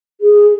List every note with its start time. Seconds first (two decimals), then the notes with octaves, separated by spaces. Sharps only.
0.21 G#4